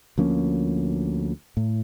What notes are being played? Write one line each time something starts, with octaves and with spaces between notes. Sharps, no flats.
D2 F3 A#3 C#4
A2